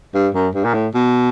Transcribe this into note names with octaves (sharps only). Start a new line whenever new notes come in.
G2
F#2
G2
A#2
A2
B2